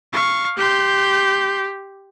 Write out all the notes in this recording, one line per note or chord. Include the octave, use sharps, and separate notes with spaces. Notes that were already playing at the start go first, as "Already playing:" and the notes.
F5 C#6
G4 C6 G6